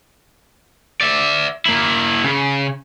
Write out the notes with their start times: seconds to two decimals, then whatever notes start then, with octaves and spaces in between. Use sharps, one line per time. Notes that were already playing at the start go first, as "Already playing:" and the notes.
1.01 D5 E5
1.65 A#3 E4
2.24 C#3